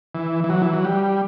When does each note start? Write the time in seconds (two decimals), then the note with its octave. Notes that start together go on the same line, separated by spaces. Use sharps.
0.15 E3
0.44 E3
0.50 F#3
0.62 E3
0.73 F#3
0.85 G3